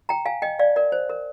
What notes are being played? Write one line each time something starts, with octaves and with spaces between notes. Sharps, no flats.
G5 A#5
F5 G#5
D#5 G5
D5 F5
A#4 D5
C5
A#4